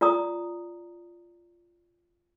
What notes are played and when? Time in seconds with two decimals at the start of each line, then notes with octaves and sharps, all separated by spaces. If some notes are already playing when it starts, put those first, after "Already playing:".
0.01 F4 D5 A#5 D#6